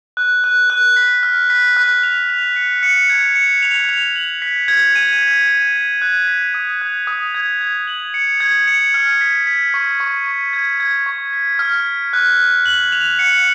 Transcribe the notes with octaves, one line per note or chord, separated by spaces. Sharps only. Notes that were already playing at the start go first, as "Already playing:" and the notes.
F#6
F#6
F#6
B6
F6
B6
F#6
F7
F7
C#7
C#7
G#6
C#7
F7
F7
F#7
B6
G#6
D#7
B6
D#7
B6
F#6
B6
D#6
F#6
D#6
G#6
G#6
F#7
C#7
G#6
C#7
F6
B6
B6
C#6
C#6
C#6
G#6
G#6
C#6
B6
F6
B6
F#6
F#6
F#7
F7
C#7